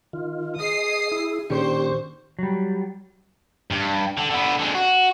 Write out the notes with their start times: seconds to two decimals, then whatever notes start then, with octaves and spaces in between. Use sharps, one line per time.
0.13 D#3 F4
0.60 G#4 D#5 D#6 C7
1.12 E4
1.50 A#2 D#3 C#4 D4 G4 C5 C#6
2.39 F#3 G3
3.71 G2
4.17 D3
4.31 D3 B3
4.59 D3 G#3
4.75 F#4